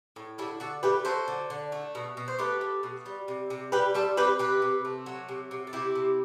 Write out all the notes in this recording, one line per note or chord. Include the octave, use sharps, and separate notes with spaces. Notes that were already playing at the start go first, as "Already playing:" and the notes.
A2
D3 E4 G4
D3 F#4 A4
A3 G4 B4
F#3 A4 C5
D3
D3
A3
B2
B2
C5
A3 G4 B4
A3
B2
G3
C3
C3
G3 G4 B4
G3 A4 C5
C3 G4 B4
C3 G4 B4
C3
A3
F#3
C3
C3
A4
C3 E4 G4
C3